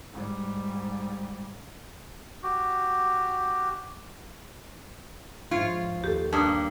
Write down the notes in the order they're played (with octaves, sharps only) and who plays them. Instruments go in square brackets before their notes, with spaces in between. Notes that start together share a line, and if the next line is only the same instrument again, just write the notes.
[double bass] G#2 G3
[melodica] F#4 G4
[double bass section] G#2 F3 [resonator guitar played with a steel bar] F4 [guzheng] C#5
[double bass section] D#2 [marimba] G4 A4
[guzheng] G2 A#3 [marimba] A5 D#6